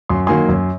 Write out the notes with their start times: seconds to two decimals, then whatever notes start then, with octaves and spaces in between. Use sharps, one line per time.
0.09 F#2 C6
0.27 D#3 F#3 A#3 G#5 C6
0.49 F#2